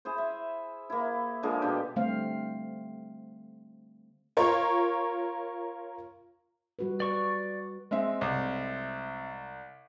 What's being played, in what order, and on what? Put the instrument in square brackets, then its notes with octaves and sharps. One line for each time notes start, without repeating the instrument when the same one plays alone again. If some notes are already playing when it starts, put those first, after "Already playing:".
[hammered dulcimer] E4 G#4 C5
E5
A#3 E4
D3 F3 G#3 A#3
B2 D4 G4
[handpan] D3 G3 A3 C4 C5 F5
[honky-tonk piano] F4 A#4 C#5 C6 C#6
[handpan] G3 F#4 B4
[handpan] B4 [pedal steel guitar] D5 C#6
[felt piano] G#3 C4 E5
[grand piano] C2